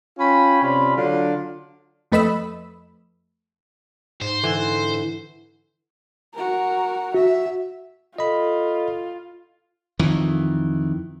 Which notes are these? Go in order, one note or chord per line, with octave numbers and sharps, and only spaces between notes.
C#4 F4 G5 B5
C3 C#4 F4 D5 B5
D3 F#3 D4 F4
F2 A3 B4 D#5 B5 E6
G#2 C5
D3 E3
F#4 A#4
F#4 E5
F4 A4 D#5 B5
F2 D#3 E3